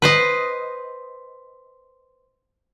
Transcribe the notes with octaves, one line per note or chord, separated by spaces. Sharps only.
B4 C5 D#5